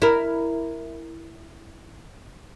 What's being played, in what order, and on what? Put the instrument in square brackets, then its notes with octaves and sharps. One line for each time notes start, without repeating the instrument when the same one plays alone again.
[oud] E4 A#4